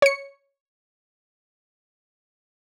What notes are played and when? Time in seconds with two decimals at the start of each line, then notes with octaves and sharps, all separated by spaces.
0.02 C#5 C#7